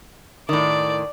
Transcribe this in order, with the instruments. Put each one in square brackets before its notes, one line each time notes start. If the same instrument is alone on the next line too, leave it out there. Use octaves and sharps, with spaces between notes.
[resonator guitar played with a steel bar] A2 D#3 [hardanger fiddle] D5